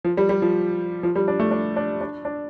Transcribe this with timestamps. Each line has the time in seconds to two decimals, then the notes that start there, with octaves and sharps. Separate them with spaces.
0.04 F3
0.17 G3
0.29 G3
0.42 F3
1.03 F3
1.16 G3
1.28 D4
1.40 A3
1.51 D4
1.76 D4
2.01 D4
2.25 D4